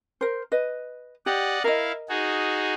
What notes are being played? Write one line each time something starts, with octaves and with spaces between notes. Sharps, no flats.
A#4 C5
B4 D#5
G4 D5 D#5 F#5
E4 A#4 D#5 F5
D#4 F#4 G#4